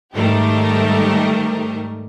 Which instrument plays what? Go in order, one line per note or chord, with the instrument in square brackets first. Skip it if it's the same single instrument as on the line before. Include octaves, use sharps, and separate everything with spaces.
[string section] G#2 D#3 G3 A3 G4 A#4